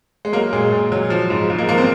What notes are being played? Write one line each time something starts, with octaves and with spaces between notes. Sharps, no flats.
G#3
F#3 A#3
A#2 G#3
A#2
F#3
F3
G#2
G#2
A#3
F3 A#3
C4